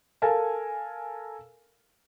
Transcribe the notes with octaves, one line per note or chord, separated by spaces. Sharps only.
A4 A#4 F5 G#5 A5